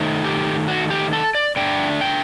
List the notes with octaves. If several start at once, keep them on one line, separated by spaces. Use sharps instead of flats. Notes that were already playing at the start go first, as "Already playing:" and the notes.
Already playing: D#3 A3 D#4
G4
F#4
G4
A4
D5
D3 A3 D4 G5
G5